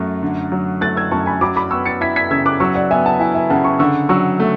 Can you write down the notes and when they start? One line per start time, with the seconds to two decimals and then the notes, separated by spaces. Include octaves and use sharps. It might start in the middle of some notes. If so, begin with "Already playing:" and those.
Already playing: F#2 F#3 A3
0.23 D3
0.52 F#3
0.81 A3 F#6 A6
0.96 E6 G#6
1.11 F#2 A5 C#6
1.26 G#5 B5
1.41 F#3 B5 D6
1.56 B5 D6
1.71 B3 C#6 E6
1.86 A6 C#7
2.01 E4 G#6 B6
2.16 G#6 B6
2.31 C#3 E6 G#6
2.46 D6 F#6
2.60 F#3 C#6 E6
2.75 D5 F#5
2.91 B3 E5 G#5
3.05 F#5 A5
3.20 E4 E5 G#5
3.35 E5 G#5
3.50 C#3 F#5 A5
3.64 A5 C#6
3.79 D3 C#6 E6
4.09 F#3 C#6 E6
4.40 A3